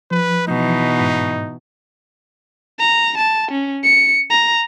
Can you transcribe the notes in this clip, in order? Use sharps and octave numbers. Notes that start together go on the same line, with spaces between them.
F3 B4
B2 E3 D#4
G#2
A#5
A5
C#4
C#7
A#5